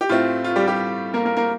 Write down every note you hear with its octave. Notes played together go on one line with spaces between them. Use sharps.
G4
A2 A3 C4 F4
F4
G3 G4
G3 G4
A#3 A#4
A#3 A#4
A#3 A#4